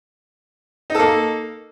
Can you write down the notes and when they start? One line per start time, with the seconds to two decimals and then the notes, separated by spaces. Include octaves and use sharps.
0.90 D#4
0.95 A4
0.99 A#3